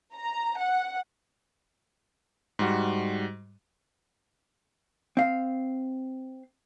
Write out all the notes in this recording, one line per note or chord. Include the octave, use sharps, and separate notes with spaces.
A#5
F#5
G#2 G3 F#4
C4 F5